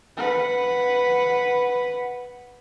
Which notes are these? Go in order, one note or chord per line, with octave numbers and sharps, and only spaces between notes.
B4 F#5